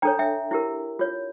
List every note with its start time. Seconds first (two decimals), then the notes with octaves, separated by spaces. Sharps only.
0.02 D4 A4 C#5 G5 A#5
0.19 E5 G5
0.51 E4 G4 A#4
0.99 F4 C#5